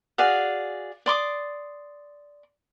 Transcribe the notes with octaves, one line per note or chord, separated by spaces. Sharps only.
F#4 G#4 D5 F5
D5 C6 D6 D#6